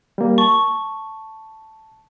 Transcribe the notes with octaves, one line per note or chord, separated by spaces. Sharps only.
G3 A#3
A5 C#6